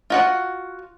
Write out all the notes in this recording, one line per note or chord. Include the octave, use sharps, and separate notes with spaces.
F4 F#4 F#5